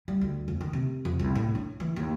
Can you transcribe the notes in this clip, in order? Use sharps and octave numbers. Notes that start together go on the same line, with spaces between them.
G3
D2
F2
D#3
C3
F2
C2
A2
D4
E3
D#2